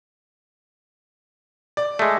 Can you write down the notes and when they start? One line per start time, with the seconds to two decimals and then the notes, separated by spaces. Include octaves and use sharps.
1.77 D5
1.99 G#3 A3